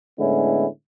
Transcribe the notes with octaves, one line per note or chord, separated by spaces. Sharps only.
A2 D3 G#3 B3 C#4 E4